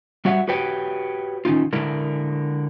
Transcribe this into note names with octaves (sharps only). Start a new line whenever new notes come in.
G3 F#4 C#5 E5 F#5
F#4 G4 B4 C#5 G5
D#3 C#4 D#4 F4
D3 G#3 E4 A#4 D5